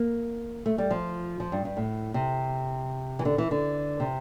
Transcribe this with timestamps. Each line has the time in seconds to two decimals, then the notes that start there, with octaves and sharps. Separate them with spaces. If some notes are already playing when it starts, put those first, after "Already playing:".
Already playing: A#3
0.66 A3
0.78 G3
0.91 F3
1.40 F3
1.52 G2
1.65 G2
1.77 A2
2.14 C3
3.19 E3
3.25 D3
3.38 E3
3.51 D3
4.00 C3